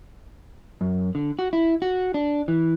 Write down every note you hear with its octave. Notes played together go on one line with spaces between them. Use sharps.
F#2
D3
F#4
E4
F#4
D4
E3